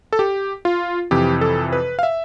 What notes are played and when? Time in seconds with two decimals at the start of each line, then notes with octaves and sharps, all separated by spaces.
0.13 A4
0.19 G4
0.65 F4
1.11 F2 C3 E3 G4
1.41 A4
1.73 B4
1.99 F5
2.03 E5